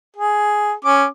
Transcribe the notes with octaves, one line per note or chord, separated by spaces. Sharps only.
G#4
C#4 D6